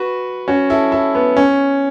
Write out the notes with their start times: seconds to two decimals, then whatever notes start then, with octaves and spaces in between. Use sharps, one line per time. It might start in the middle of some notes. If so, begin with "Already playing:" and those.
Already playing: F#4 B4
0.48 C#4 F#4
0.70 E4 A4
0.92 E4 A4
1.15 B3
1.37 C#4